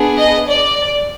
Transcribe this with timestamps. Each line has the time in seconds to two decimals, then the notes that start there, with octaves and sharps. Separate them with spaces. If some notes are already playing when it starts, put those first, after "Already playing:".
Already playing: B3 D4 G#4
0.18 D#5
0.47 D5